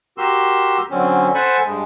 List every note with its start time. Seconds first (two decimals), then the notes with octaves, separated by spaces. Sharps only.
0.18 F#4 G4 A#4 C6 E6
0.91 D3 F#3 C4 C#4
1.34 A4 C5 F#5 G#5 A5 B5
1.65 G2 G#3